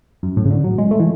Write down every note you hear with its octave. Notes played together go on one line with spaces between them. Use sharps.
F#2
A2
C#3
D3
F#3
G#3
A3
E3